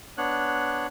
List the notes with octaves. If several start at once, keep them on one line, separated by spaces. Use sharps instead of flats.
B3 D4 C#5 F#6